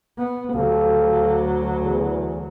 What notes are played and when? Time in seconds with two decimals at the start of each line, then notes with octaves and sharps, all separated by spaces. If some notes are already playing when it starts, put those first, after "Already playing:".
0.17 B3
0.53 D2 F#3 G4 A4 F5
1.83 E2